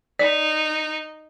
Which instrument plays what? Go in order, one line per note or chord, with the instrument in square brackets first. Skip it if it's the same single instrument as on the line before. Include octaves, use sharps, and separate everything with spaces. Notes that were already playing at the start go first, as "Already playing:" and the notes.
[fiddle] D#4 [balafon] D5